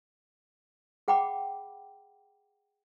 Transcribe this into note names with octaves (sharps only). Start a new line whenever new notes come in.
G#4 F#5 G5 B5 D6